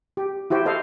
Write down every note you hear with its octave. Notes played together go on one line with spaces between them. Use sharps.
G4
E4 F#4 G4 C5
A4 C5 D#5 F5